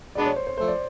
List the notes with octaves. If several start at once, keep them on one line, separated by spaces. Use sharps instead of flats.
B2 G#3 B3 D4 D5
C#5
C5
C5
F3 A3 C5
D5